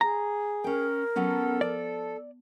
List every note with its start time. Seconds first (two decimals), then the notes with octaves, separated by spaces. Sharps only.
0.01 G#4 A#5
0.64 C#4 A#4 G5
1.16 F#3 B3 C#4 A4
1.61 F3 D5